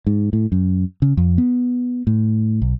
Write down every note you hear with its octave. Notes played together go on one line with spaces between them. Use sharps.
G#2
A2
F#2
C#3
F2
B3
A2
B1